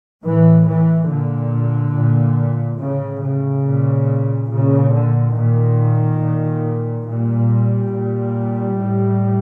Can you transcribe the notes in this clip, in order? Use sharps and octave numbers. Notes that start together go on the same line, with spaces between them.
A2 E3
E3
A#2 D3
A#2
A2 C#3
C#3
A#2
A#2 C#3
D3
A#2 D#3
A#2
A#2 G3
A#2
A2